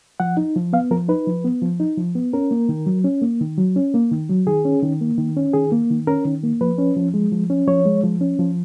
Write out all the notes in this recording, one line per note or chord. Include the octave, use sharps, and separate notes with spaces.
F3 F#5
D#4
F3
B3 F5
F3 A#4
D#4 B4
F3
B3
F3
D#4
F3
B3
C#4 A#4
A#3
D#3
F#3
C#4
A#3
D#3
F#3
C#4
A#3
D#3
F#3
D#3 G#4
C#4
D#3
A#3
D#3
C#4
D#3 G#4
A#3
D#3
C#4 A#4
D#3
A#3
F3 B4
C#4
F3
G#3
F3
C#4
F3 C#5
G#3
F3
C#4
F3